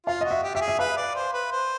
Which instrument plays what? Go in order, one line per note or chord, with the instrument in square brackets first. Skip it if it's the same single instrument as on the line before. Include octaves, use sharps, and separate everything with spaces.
[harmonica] F4 [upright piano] F5
[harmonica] F#4 [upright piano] D#5
[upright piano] E5
[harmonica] G4
[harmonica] G4 [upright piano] E5
[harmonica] G#4
[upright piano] E5
[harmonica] B4 [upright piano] F5
[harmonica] D5
C5
B4
C5